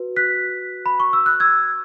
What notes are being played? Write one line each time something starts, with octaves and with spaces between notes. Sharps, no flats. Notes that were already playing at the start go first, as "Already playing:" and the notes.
Already playing: F#4 B4
F#6 B6
B5
C#6
E6
F#6
E6 G#6